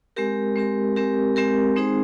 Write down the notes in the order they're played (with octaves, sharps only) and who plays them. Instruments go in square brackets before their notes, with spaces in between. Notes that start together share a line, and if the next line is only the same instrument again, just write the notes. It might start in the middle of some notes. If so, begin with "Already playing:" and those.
[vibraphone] G#3 C4 G4 A#4
G#3 C4 G4 A#4
G#3 C4 G4 A#4
G#3 C4 G4 A#4
G#3 C4 D#4 G#4 C5